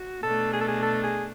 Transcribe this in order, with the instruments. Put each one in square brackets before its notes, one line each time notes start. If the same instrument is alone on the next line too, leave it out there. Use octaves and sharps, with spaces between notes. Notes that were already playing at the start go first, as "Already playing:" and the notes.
Already playing: [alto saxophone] F#4
[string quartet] B2 A3 D4 [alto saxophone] A4
[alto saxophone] G#4
A4
G#4
A4
G#4